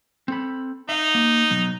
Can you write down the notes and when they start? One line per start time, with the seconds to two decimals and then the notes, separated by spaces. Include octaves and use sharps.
0.28 C4 A4 B5
0.89 D#4 E5 F5
1.15 A#3
1.50 B2 F#3 B3